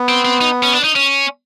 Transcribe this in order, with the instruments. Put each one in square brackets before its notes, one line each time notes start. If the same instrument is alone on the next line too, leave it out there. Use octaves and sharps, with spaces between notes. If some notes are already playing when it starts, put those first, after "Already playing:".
Already playing: [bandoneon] B3
[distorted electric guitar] C4
C4
D#4
C#4
D4
D#4
C#4